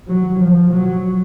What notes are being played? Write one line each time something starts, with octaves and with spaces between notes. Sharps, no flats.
F#3
F3
F#3